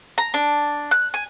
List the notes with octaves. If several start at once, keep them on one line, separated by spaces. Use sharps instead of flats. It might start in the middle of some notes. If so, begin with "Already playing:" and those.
A#5
D4
F#6
G#5